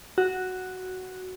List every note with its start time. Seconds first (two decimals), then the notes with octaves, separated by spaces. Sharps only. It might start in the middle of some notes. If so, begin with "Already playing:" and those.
0.18 F#4